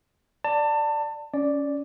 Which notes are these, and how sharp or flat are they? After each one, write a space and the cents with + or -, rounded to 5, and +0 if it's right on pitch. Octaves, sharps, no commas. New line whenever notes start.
D5 +0 A5 +25
C#4 +15 D5 +0